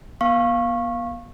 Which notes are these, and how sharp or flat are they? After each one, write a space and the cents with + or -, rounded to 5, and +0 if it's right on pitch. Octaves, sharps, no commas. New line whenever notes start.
B3 -40 F5 +0 C#6 -20